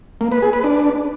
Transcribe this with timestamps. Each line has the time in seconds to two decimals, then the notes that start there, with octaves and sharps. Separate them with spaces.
0.21 A#3
0.32 B4
0.42 G#4
0.53 B4
0.64 D4